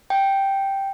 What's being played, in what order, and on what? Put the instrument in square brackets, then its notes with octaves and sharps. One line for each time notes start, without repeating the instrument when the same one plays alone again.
[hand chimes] G5